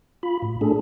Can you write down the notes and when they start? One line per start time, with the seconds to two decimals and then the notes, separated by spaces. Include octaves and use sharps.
0.23 F4 B5
0.42 A2
0.61 A3 D4 G#4 A4